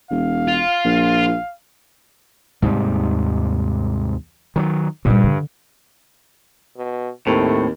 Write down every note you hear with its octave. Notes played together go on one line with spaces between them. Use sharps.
E1 F5
F4
A#1
D#2 G#2 C3 G3
D#3 F3 F#3
G2 A#2 G3
D3
B2
D#2 A2 A3 C4